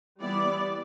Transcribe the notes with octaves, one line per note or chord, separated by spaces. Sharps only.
E3 G3 B3 E4 D5